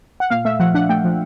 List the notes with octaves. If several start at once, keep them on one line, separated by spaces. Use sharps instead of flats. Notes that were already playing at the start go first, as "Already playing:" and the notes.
F#5
A#2 F5
A3 E5
F3 F#5
D4 F#5
A3 G5
F3